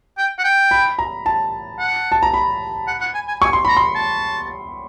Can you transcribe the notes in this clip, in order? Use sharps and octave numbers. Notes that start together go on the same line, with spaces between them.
G5
F#5
G5
B5
A#5
A5
F#5
A5
A#5
B5
F#5
F#5
G#5
G#5
G#5 C#6
C6
A#5 B5
C6
A5